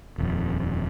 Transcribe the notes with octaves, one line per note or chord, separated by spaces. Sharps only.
D#1 F2